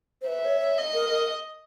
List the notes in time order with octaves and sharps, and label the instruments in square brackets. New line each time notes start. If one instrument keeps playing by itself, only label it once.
[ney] C5
[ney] B4 [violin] E5
[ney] C#5
C#5
[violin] D#5
[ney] A#4
A#4